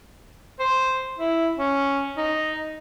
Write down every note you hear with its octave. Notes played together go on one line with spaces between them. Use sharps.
C5
E4
C#4
D#4